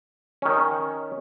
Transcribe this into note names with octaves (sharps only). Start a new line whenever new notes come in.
D#3 C#4